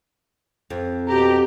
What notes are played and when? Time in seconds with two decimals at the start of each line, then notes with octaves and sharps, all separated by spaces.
0.70 F2
1.08 B2 G4 A#5